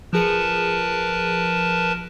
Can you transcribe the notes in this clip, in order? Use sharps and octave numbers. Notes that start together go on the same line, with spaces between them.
F3 G#4 A#4 B4 A5 C#7